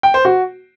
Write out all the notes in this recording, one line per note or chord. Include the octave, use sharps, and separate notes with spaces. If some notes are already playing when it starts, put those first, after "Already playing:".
G5
C5
F#4